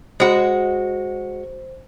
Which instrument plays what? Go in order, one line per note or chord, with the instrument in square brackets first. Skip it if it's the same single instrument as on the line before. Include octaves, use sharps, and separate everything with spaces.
[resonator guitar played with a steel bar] G#3 F#4 [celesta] C5